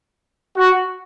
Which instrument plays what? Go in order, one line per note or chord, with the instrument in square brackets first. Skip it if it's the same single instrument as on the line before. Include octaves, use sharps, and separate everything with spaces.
[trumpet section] F#4